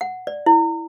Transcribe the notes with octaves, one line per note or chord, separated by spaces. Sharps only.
F#5
D5
E4